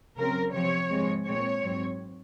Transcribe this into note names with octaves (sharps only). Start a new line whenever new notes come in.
C#3 F#3 C4 A#4
C3 F3 C4 C#5
G#2 F3 G#3 C4
A#2 G#3 C4 C#5
G#2 F#3 C4